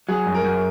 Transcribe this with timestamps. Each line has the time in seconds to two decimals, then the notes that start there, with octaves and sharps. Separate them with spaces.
0.08 F#3 G#4
0.27 F#2
0.35 A#4
0.44 F#2